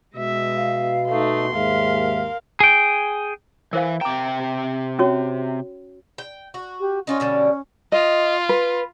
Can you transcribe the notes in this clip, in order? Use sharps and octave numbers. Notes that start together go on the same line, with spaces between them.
B2 G#3 E5
F5
A3 D#4 C6
D#2 G#2 A#4 E5 F5
G#4 G5
E3 A#4 C5 F5
C3 G5 A#5 D6
C#4 F#4 C#5
G5
F#4
G4
C#4 D#4 F4 F#4
B2 D3 G3
F4 D#5
B4